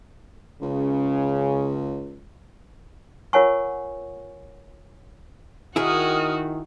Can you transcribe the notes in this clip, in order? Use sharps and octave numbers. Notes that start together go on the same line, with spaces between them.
C#2 C#3
F4 A#4 C#5 F#5 G#5 C#6
D#3 E4 F#4 G#4 D#6 F6